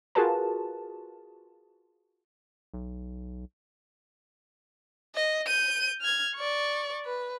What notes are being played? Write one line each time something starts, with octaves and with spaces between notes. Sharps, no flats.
F4 F#4 G#4 A#4 B4 A5
B1
D#5
G6 D#7
F6 G#6
D5 C#6
B4